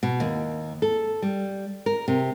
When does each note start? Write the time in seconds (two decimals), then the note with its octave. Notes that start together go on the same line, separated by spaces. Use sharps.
0.03 B2
0.20 D#2
0.82 A4
1.22 G3
1.86 A#4
2.08 C3